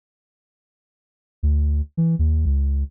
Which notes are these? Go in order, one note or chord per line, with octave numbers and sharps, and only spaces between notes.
D2
E3
D#2
C#2